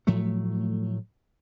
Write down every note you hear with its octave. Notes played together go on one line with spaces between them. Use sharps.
A2 F3 F#3 A3